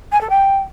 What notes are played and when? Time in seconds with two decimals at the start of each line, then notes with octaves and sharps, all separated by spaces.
0.12 G#5
0.21 A4
0.29 G5